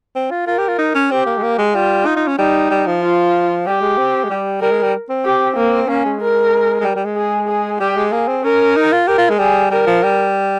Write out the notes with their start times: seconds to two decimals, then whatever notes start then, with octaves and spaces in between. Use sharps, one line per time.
0.16 C4
0.31 F4
0.47 F4 A#4
0.58 G4
0.68 F4
0.78 D#4
0.95 C#4
1.11 C4 G4
1.26 A#3
1.38 G#3
1.43 A#3
1.59 G#3
1.75 G3 F4
2.06 D#4
2.17 D#4
2.28 C#4
2.38 G3 D#4
2.71 G3
2.87 F3
3.02 F4
3.66 G3 G4
3.81 G#3
3.98 C4
4.24 G#3
4.30 G3
4.61 G3 A#4
4.71 G#3
4.83 G3
5.10 C4
5.25 G4
5.57 A#3
5.89 A#3 C#4
6.05 G#3
6.21 A#4
6.80 G#3
6.84 G3
6.96 G3
7.05 G#3
7.16 G#4
7.48 G#4
7.80 G3 G4
7.96 G#3
8.12 A#3 G#4
8.28 C4
8.43 C#4 A#4
8.76 D#4
8.92 F4
9.07 G4 A#4
9.18 F4
9.29 G#3
9.39 G3 G#4
9.71 G3 A#4
9.86 F3
10.03 G3